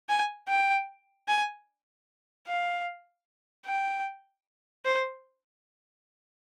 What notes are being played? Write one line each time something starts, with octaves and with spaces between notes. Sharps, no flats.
G#5
G5
G#5
F5
G5
C5